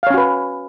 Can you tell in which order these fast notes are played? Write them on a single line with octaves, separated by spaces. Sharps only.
F5 C#5 C#4 F#4 B4